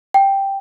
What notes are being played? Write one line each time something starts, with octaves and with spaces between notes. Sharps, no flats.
G5